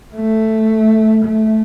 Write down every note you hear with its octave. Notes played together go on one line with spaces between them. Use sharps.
A3
A3